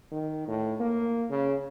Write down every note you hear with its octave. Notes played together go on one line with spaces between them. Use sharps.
D#3
A2
A#3
C#3